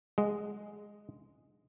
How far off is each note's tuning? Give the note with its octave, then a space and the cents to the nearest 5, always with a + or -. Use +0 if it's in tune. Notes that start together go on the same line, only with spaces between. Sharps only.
G#3 -5 D#5 +0 F#5 -5